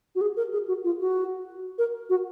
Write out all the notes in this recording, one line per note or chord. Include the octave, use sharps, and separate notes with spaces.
F#4
G#4
A#4
G#4
F#4
F4
F#4
A#4
F#4